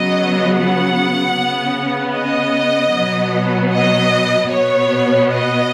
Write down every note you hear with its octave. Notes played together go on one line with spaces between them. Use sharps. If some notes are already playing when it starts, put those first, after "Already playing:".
Already playing: C#3 F#3 B3 D#5
F#5
C#3 B3
D#5
B2 F#3 B3
D#5
B2 B3 C#5
D#5